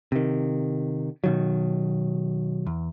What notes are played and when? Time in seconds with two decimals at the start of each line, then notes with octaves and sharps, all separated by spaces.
0.12 C3 D#3
1.24 B2 D#3 F#3
2.67 E2